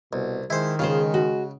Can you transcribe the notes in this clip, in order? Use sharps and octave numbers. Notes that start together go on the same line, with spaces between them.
C2 B2
D#3 G#3 E4 C5
C#3 G#3 F4 G#4 C5
F#4